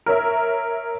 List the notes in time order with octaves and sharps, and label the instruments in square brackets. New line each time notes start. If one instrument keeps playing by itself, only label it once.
[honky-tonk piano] A#4 C#5 E5